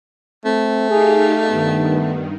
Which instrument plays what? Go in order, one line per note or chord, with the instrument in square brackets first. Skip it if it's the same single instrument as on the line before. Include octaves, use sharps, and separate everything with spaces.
[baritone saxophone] A3 [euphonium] C4
[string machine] D#4 G4 F5 [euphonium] G#4
[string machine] G2 D#3 [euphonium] B3